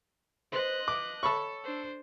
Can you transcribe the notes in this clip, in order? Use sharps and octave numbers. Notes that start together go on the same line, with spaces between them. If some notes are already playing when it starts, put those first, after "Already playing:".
B4 C5 D#5 F#6
F3 B4 D6
A4 C#5 B5 C#6
D4 C5